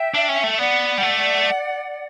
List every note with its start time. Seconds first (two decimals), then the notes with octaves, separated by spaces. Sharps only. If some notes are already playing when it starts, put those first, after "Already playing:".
Already playing: E5 G5
0.14 D4
0.29 C#4
0.44 A3
0.51 E5
0.58 B3 D5 F#5
0.98 G3
1.02 A3